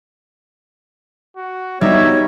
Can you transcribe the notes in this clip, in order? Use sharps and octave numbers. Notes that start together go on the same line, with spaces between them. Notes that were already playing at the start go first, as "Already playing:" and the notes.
F#4
G3 B3 D#4 F#4 C#5 E5